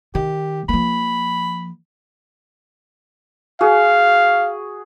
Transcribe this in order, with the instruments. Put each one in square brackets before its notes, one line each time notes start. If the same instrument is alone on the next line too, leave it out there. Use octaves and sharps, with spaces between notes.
[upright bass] D#3 [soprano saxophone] G4
[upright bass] F3 A#3 [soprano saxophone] B5
[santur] F#4 G#4 [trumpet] F5